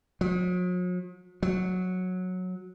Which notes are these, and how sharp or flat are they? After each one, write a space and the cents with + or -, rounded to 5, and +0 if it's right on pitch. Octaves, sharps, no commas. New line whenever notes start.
F#3 -45
F#3 -10